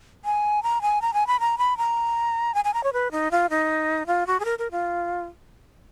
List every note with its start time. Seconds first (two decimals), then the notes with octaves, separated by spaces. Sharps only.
0.25 G#5
0.63 A#5
0.82 G#5
1.02 A#5
1.14 G#5
1.27 B5
1.40 A#5
1.58 B5
1.78 A#5
2.55 G#5
2.65 G#5
2.74 A#5
2.84 C#5
2.93 B4
3.11 D#4
3.31 F4
3.50 D#4
4.07 F4
4.27 F#4
4.40 G#4
4.45 A#4
4.59 A#4
4.71 F4